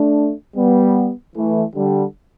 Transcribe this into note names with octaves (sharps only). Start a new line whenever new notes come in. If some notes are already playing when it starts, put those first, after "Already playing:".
Already playing: A3 D4
G3 B3
E3 A3
D3 G3